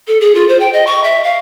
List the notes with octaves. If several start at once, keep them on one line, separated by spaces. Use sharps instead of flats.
A4
G#4
F4
C5
G5
D#5
C#6
E5
F5